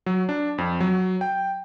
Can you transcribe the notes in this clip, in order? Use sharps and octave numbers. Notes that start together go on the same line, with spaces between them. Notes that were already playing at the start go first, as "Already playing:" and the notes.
F#3
D4
F2
F#3
G5